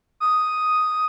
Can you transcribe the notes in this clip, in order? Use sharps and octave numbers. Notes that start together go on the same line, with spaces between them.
D#6